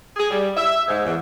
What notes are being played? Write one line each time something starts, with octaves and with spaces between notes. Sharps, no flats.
G#4
G3
E5
G#2
E2